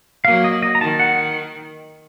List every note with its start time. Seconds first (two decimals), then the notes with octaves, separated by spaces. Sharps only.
0.25 F#3 A#3 F5
0.44 D#5
0.62 D#5
0.75 A#5
0.81 D#3 A5
0.99 F#5